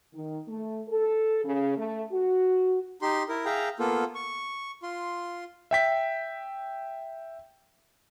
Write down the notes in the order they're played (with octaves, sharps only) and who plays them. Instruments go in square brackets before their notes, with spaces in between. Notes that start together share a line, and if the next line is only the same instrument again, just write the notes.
[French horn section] D#3
A3
A4
C#3
A3
F#4
[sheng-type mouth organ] D#4 G4 C6
E4 A#4
G#4 E5 F5 G5 A#5
A#3 B3 F4 A4
C#6
F4 C6
[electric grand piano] E5 G5 B6